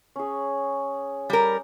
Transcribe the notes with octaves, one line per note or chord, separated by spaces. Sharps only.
C#4 G#4
G3 A#4